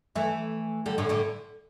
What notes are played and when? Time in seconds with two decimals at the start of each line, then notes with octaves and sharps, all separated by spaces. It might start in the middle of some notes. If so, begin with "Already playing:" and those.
0.16 E3 A3
0.86 D3 G3
0.98 A2 D3
1.09 A2 D3